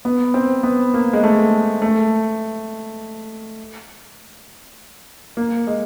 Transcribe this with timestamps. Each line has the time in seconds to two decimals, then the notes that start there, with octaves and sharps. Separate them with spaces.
0.05 B3
0.34 C4
0.63 B3
0.94 A#3
1.13 G#3
1.24 A3
1.82 A3
5.37 A#3
5.67 G#3